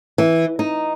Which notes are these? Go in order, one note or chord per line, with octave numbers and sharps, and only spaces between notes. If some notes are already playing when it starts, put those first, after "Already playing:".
E3
D#4